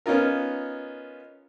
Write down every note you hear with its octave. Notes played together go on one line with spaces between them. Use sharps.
B3 C#4 D#4 F4 A#4